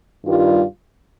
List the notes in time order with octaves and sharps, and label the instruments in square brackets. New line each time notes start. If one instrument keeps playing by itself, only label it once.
[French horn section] G2 D#3 G3 F4